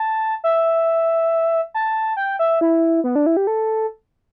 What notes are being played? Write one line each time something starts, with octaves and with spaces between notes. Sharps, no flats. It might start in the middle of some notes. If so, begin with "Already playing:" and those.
Already playing: A5
E5
A5
G5
E5
E4
B3
D4
E4
G4
A4